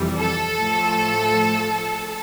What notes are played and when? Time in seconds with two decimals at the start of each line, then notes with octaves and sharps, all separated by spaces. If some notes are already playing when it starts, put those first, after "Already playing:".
Already playing: F2 C3 E3 G3
0.19 A4
0.58 A2 F3 A3